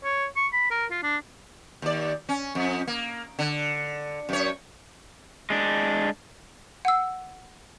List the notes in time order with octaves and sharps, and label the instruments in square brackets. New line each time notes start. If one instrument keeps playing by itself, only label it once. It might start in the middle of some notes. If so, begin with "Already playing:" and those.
[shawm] C#5
C#6
B5
A#4
F4
D4
[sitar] D#2 D5
C#4
F2
A#3
D3
F#2 C#5
[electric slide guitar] G#3 D4
[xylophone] F#5 E6